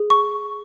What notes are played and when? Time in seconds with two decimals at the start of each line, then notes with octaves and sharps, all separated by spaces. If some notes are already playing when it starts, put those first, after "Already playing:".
Already playing: G#4
0.10 C#6